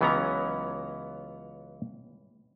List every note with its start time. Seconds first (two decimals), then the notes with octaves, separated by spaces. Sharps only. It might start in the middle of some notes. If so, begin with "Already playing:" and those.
0.01 C#2 E3 F#3 B3 C#4 A#5